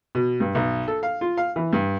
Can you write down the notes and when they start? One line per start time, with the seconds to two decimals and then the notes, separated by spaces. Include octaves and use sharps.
0.15 B2
0.40 G2
0.55 B1
0.88 A4
1.03 F5
1.21 F4
1.37 F5
1.56 E3
1.73 G2